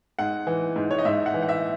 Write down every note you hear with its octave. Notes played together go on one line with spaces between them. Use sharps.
G#2 F#5
E3
G#2
C#5
D#5
G#2 E5
F#5
E3
F#5
E5